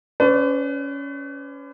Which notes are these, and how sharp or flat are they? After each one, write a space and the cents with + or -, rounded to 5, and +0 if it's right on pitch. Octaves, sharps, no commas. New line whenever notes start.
C#4 +15 B4 +40 D5 -5